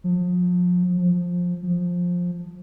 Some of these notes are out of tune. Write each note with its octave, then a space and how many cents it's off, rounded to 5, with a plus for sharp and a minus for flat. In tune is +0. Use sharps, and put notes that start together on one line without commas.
F3 +35
F3 +15
F3 +15